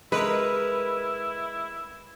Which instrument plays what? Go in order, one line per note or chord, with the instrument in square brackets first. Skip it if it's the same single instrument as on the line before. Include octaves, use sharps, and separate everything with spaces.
[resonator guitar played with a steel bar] G#3 A#4 [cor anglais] E4 [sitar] B4